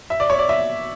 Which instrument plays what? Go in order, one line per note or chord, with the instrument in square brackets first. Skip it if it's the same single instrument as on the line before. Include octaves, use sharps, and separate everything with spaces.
[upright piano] E5
D5
C#5
D5
E5